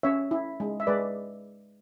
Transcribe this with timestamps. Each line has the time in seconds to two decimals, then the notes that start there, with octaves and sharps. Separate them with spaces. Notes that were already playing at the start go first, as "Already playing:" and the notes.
0.03 C#4 C#5 E5
0.31 E4
0.60 G#3
0.80 E5
0.87 G#3 B4 D5